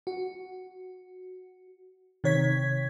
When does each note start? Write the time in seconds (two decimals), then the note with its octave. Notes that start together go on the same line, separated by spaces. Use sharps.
0.07 F#4
2.24 C3 D#3 C#5 G#6 B6